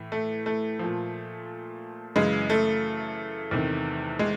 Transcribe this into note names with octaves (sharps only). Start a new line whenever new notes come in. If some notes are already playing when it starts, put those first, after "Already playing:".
Already playing: A2 E3
A3
A3
A#2 F3
F#2 C#3 E3 G#3
A3
E2 C3 D#3
G#3